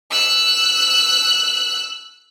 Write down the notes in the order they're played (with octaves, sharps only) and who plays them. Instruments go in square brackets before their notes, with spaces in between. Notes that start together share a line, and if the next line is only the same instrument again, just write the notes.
[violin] E6 F#6